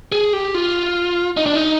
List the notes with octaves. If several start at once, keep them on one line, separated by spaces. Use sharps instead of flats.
G#4
G4
F4
D#4
D4
D#4